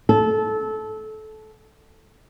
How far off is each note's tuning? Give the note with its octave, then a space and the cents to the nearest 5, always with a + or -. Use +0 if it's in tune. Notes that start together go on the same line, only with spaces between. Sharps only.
A4 -20